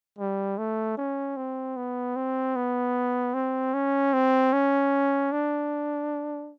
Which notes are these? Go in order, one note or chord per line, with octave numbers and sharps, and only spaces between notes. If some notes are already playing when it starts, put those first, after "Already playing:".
G3
A3
C#4
C4
B3
C4
B3
C4
C#4
C4
C#4
D4